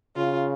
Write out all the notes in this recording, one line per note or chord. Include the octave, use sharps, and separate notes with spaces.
C#3 F4